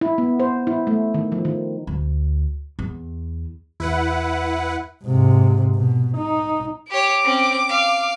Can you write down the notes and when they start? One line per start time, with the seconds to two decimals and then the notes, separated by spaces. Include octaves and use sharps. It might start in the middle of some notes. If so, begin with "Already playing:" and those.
0.01 E4
0.18 B3
0.40 C5
0.67 E4
0.87 A3
1.14 D#3
1.32 F3
1.45 D#3
1.87 D2
2.79 E2
3.80 E2 E4 B4 F#5
5.03 G#2 C3
5.76 B2
6.17 D#4
6.91 G4 C#5 D6
7.24 C4 C#4
7.69 F5